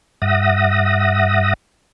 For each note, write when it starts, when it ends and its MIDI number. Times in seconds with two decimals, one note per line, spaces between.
0.22 1.53 43
0.22 1.53 76
0.22 1.53 78
0.22 1.53 87
0.22 1.53 94